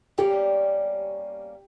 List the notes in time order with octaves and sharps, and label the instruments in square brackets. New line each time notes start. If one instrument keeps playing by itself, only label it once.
[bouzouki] G3 A#3 C#4 [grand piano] G4